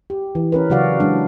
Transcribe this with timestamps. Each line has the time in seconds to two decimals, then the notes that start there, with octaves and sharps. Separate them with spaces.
0.10 G4
0.35 E3
0.52 C#4 A#4 B4
0.70 C#3 F#3 F#4 D5 F5
1.00 F#3 G#3 D4